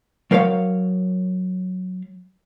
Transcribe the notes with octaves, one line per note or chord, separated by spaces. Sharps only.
F#3 A#4 C5 C#5 F5